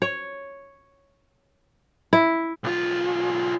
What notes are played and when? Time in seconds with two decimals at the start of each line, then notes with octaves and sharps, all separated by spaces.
0.02 C#5
2.13 E4
2.64 B1 F4